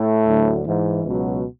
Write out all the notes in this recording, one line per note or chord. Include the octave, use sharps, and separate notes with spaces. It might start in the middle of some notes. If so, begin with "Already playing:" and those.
Already playing: A2 A3
D2 D3 F#3
G#2 E3
C#2 B2 F#3